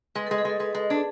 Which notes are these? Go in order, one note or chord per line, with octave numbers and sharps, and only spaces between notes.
G#3 B4
A4
G#3
G#4
G#3 A4
G#3 B4
G#3 A4
D4 G#4